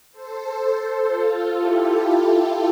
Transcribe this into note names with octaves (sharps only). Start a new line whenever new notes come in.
A4 C5
F4 A4
E4 G4